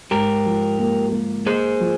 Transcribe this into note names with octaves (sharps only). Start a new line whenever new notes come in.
G#2 G4 A#4
F3
A#3
A#3
A#3 G#4 C5
F3